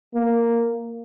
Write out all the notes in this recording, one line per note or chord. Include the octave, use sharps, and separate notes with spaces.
A#3